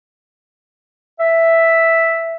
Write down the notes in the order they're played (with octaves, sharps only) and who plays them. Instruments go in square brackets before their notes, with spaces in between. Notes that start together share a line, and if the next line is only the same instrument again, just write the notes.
[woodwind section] E5